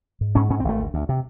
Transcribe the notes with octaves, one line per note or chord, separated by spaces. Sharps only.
G#2
G#2 C#4
G#2 C#4
C4
G#1 A3
D2
D2
C3